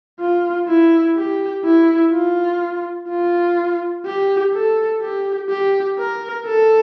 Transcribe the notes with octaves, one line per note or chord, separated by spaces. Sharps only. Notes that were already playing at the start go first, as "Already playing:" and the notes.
F4
E4
G4
E4
F4
F4
G4
A4
G4
G4
A#4
A4